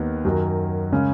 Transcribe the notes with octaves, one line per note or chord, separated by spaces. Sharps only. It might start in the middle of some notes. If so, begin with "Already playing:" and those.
Already playing: D#2 D#3 B3
F#2 D#3 F#3
C#3 G#3 C#4